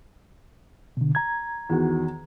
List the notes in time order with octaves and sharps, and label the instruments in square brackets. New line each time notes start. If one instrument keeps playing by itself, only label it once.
[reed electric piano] B2 D3
A#5 G#6
[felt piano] E2 D#3 F#4